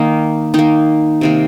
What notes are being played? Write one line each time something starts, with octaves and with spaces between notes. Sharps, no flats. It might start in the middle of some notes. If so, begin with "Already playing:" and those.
Already playing: D#3 A#3 D#4
D#3 A#3 D#4
C3 D#3 A#3